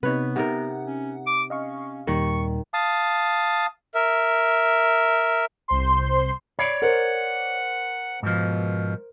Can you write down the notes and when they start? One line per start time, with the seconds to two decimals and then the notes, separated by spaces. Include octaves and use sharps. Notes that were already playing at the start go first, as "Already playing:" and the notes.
0.03 C3 B3 D#4 B4 C#5
0.36 C3 D#4 A#4 F#5
0.86 C#4
1.27 D6
1.50 C#4 D#5 F5 C#6
2.07 D#2 A#2 D#3 G3 C#6
2.74 F5 A5 D#6
3.95 A#4 E5
5.68 C2 C5 C6
6.59 C#5 D5 B5 C7
6.82 A#4 C5 F#5
8.23 G#2 B2 F3